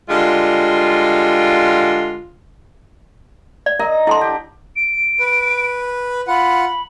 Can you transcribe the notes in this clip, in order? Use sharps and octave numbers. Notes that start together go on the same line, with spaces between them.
D3 G3 G#3 F4
D5
A#4 D#5 A#5
D3 E4 A4 C6
G4
D7
B4
F4 F#5 B5